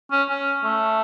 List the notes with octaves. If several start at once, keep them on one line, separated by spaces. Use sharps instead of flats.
C#4
C#4
A3